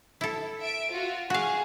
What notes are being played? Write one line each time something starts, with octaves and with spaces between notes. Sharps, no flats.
E4 A4
E5 D7
F4 F#4
F#4 G#4 F5